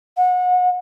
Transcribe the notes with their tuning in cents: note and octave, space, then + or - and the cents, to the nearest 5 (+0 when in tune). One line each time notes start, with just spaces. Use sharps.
F#5 -30